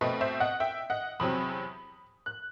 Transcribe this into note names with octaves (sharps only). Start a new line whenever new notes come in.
B2 A3 C4 B4 D#5
C5 E5
D#5 F#5
E5 G5
D#5 F#5
E2 C3 F#3 C4 B5 D#6
F#6